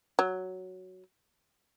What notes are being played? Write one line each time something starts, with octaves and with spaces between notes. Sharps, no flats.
F#3